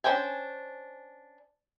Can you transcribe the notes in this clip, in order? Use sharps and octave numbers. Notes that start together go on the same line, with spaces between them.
C#4 D4 C5 G5 G#5